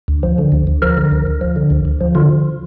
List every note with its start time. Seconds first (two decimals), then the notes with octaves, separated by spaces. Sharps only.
0.08 D2
0.23 F3
0.38 D3
0.52 D2
0.67 D2
0.82 F3 A#4
0.97 D3
1.12 D2
1.27 D2
1.41 F3
1.56 D3
1.70 D2
1.85 D2
2.01 F3
2.15 D3 F4